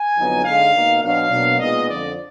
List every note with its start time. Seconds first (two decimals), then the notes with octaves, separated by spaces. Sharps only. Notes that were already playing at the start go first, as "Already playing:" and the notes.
Already playing: G#5
0.16 F2 D3 F#3 B3 D#4
0.44 D3 G#3 D#4 F5
0.73 B2 A#3 D#4
1.02 B2 F#3 D4 F5
1.30 B2 F#3 A#3 D4
1.59 A#2 G#3 B3 D#4 D#5
1.88 F2 D3 F3 D5